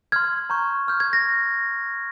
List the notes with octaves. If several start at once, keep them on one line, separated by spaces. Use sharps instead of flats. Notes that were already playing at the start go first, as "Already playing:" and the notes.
C6 F6 G#6
A#5 C#6 G6
C6 F6 G6
G#6
A#6